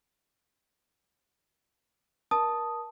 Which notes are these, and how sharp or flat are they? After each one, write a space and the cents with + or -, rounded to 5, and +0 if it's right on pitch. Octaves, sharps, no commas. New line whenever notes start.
A#4 +25 A5 +0 D#6 +0